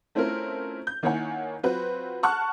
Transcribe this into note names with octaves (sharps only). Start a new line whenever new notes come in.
A3 C4 C#4 E4 F4 A#4
G6
D#3 A#3 E4 C#5 F#5 G#5
F#3 C4 F4 F#4 B4
F#5 A5 C#6 F6 F#6